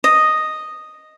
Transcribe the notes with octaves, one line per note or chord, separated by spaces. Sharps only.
D#5